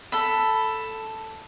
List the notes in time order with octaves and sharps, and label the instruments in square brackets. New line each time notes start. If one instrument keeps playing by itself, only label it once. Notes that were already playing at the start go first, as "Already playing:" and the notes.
[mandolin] A4 B5